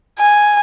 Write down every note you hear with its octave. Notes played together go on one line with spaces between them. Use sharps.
G#5